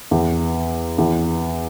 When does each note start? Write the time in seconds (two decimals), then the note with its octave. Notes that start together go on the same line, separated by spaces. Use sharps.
0.11 E2
0.98 E2